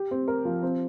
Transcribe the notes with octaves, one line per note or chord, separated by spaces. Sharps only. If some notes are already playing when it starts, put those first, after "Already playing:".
Already playing: G4
C4
A#4
F3
C4